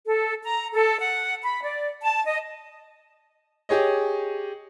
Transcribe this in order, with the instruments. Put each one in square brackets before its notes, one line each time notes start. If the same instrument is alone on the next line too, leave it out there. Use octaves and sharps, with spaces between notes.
[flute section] A4
A#5
A4
F#5
B5
D5
A5
D#5
[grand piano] G4 G#4 C#5 D#5